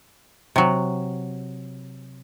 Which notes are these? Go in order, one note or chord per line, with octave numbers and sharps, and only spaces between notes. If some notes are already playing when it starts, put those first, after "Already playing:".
C3 F#3